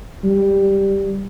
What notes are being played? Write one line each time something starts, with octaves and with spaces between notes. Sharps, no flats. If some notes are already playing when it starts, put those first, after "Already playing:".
G3